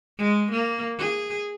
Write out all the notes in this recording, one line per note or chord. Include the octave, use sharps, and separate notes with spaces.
G#3
A#3
G#4